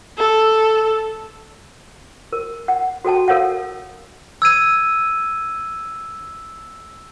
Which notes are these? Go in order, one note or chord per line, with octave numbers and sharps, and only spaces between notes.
A4
A#4
F#5
F#4 A4 G5 A5
A4 A#4 C#5 F5 F#5
E6 G#6 D#7